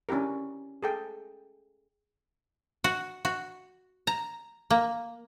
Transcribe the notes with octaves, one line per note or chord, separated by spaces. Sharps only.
C#4 D4 E4 G4 A#4
G#4 A4 G5
F#4
F#4
A#5
A#3